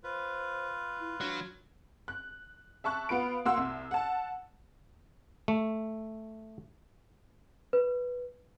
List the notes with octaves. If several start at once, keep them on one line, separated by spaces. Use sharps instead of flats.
F4 B4 C5
E4
F#3 D4
F#6
E5 A5 C#6 F#6
B3 F4 B4 D7
A#3 F#4 F#5 C6 E6
C2
F#5 A5
A3
B4